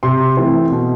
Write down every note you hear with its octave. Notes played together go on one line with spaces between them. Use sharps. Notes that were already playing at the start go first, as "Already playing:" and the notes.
C3 C6
E3 A3 C4
B2